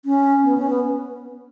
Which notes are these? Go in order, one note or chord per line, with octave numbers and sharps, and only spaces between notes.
C#4
B3
C#4
B3